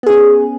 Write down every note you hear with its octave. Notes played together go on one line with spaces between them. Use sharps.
B3 C#4 G#4